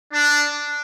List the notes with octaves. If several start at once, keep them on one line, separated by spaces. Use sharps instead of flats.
D4